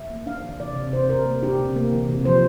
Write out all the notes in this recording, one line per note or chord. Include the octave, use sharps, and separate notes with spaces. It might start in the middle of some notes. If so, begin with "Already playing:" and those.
Already playing: E5
A#3
D4 F5
E3
C3 D5
C3
C3 C5
C3 A#4
A#3
D4 G4
C3
A#3
E3
C3
F3 C5